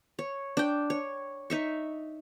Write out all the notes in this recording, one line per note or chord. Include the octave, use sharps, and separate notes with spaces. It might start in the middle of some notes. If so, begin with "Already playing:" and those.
C#5
D4 G5
C#5
D#4 E5 C#6